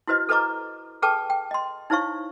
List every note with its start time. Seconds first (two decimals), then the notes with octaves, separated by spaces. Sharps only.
0.07 E4 F#4 B4 C5 D#5
0.29 A4 B4 C5 D#5 A#5 D6
1.02 G#4 A4 B4 G5 A5 D6
1.30 G5
1.51 D#5 C6
1.90 D#4 E4 C5 C#5 F5 C#6